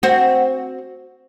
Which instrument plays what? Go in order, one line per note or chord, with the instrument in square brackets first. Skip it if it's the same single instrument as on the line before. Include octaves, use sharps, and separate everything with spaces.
[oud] C4 F#4